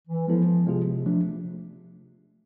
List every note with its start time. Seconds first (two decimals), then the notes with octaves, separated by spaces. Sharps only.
0.08 E3
0.27 F3 G#3 B3 E4 A4
0.67 C3 G#3 B3 F4 G#4
1.06 C3 F3 A3 D4